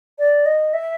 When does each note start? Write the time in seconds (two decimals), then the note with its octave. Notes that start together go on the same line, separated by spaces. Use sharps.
0.19 D5
0.46 D#5
0.73 E5